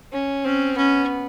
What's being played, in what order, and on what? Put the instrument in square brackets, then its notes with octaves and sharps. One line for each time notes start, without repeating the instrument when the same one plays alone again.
[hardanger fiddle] C#4
[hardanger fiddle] C4 [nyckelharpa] C#4
[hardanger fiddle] B3 [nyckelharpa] C#4